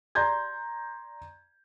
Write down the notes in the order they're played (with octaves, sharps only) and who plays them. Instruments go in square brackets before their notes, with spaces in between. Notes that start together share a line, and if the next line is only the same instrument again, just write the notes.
[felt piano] D5 A#5 C6 G6 G#6